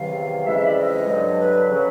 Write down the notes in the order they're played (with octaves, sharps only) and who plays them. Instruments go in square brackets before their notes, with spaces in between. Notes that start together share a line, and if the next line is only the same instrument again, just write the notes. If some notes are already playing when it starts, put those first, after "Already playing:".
Already playing: [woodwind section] E2 C3 D#3 F#3 F5
F2 C#3 E3 G#3 E5
D5
D#5
G2 D3 F#3
B4
C#3 F#3